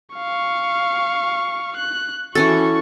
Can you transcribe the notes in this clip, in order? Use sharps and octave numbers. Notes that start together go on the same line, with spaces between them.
F5 C#6
F#6
E3 C#4 F#4 A4 C#6